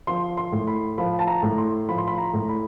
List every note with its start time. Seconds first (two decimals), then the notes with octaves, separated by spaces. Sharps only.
0.07 F3 C6
0.37 C6
0.52 A2
0.67 B5
0.98 F3 B5
1.19 A5
1.27 A#5
1.43 A2
1.58 C6
1.89 F3 B5
1.98 C6
2.08 B5
2.18 A#5
2.34 A2
2.49 B5